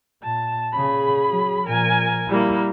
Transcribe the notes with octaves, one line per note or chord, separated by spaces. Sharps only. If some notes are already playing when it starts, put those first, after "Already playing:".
A#2 A5
A#2 C#3 G#4 B5
F#3
A#2 F3 A#4 G#5
G3 A#3 E4